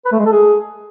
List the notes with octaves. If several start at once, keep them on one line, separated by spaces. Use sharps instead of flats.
B4
A3
G#3
A4
G#4